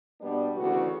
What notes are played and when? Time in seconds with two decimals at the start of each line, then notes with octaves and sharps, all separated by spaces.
0.20 B2 G3 B3 D4
0.56 D2 C#3 E3 F#4